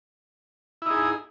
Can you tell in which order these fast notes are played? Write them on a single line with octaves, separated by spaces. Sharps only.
E4 D#4 G#4